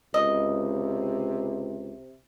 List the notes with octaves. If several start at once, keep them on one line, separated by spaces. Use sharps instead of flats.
C#2 C3 D#5